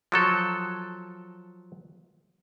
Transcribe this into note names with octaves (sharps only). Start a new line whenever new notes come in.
F3 F#3 A4